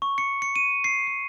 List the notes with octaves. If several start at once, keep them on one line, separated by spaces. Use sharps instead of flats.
C#6
C#7
C#7
D#7
C7
C7